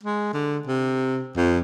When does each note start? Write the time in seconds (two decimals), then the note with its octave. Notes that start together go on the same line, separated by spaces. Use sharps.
0.03 G#3
0.34 D3
0.67 C3
1.37 F2